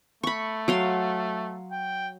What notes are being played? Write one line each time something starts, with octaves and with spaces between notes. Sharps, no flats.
A3 B5 C#6
F#3 F5 C6
G5